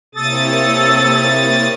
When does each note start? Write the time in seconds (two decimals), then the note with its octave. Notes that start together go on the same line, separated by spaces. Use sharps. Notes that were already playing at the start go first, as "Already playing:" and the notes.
0.15 C3 A#3 E4 A4 C#5 D#6 A6